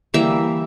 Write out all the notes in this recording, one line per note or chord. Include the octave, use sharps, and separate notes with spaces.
E3 G3 A#3 E5